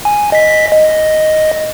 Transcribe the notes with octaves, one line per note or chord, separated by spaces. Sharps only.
G#5
D#5 B6
D#5